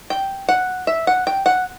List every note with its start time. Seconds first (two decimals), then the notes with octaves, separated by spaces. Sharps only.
0.10 G5
0.49 F#5
0.87 E5
1.07 F#5
1.27 G5
1.46 F#5